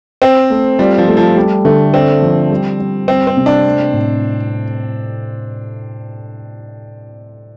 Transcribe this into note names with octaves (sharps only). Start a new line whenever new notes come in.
C4 C5
A3
G3 F4
F3
A3
F3
G3
D3 A3
C4 D4
F3
G3
G3
G3 C4
C4
C3
D4
A3
A2